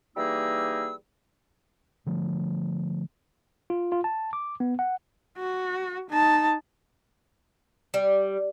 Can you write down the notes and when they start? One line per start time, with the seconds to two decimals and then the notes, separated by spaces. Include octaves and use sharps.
0.16 E3 G3 A#3 D#4 G#4 E6
2.06 D3 F3 A3
3.70 F4
3.92 F4
4.04 A5
4.33 D6
4.60 B3
4.79 F#5
5.38 F#4
6.10 D#4 A5
7.94 G3